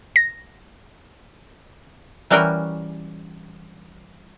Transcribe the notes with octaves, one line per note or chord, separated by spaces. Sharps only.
A#6
E3 G3 C#4 F#4 A#4 G5